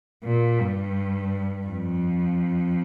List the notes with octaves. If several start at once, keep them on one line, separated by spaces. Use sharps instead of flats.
A#2
G2
F2